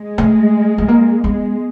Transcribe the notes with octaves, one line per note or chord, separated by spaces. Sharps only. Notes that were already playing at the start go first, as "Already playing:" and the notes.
Already playing: G#3
A3
A3
A#3
G#3 B3